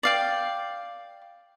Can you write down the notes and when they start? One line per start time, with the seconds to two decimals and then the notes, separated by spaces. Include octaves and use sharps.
0.03 D5 F5 G5